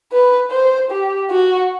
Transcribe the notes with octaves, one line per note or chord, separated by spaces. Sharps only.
B4
C5
G4
F#4